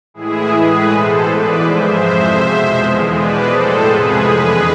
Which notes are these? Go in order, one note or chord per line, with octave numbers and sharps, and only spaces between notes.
A2 E3 G#3 E4 G#4
A2 E3 G#3 G#4 B4
B2 G#3 A4 C5
G#2 E3 G#3 B4 D5
G#2 F3 G#3 C5 E5
F2 C3 F3 G#3 C5 E5
B2 G#3
E2 D3 F3 G#3
B2 G#3 B4 D5
A2 G#3 A4 C5
F2 C3 F3 G#3 G#4 B4
E2 D3 G#3 G#4 B4